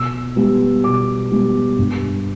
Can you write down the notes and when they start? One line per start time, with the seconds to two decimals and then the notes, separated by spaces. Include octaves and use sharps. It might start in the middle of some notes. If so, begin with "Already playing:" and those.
Already playing: B2 E6
0.36 G3 B3
0.84 B2 D6
1.32 G3 B3
1.79 G2